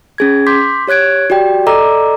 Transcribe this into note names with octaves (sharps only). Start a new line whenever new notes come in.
C#4 G#4 G#6
C6 D6 G6 B6
G4 C#5 F#6 G#6 D7
F#4 G4 D5 G5
A4 D5 D#5 A#5 D6 E6